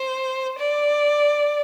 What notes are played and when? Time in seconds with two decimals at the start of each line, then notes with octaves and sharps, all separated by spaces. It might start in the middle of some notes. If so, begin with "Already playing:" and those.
Already playing: C5
0.59 D5